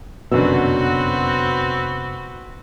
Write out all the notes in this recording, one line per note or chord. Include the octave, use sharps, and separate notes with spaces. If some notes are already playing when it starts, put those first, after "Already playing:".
F1 F#2 B2 D3 C4 F#4 B4 E6